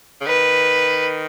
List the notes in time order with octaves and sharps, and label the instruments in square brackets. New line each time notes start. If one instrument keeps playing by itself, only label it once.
[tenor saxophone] C#3
[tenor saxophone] D#3 [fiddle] B4